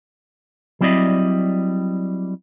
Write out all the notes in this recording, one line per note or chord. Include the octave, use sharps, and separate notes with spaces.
F#3 G3 C4 E4 D5 D#5